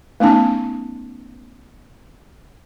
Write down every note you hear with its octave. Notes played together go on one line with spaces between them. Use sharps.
A3 B3 C#4 D#4 G#5 A5